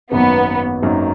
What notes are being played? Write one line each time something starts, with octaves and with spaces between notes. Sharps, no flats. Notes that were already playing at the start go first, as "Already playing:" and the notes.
G#1 F#2 D#3 F#3 A#3 B3
G#1 F#2 D#3 F#3 A#3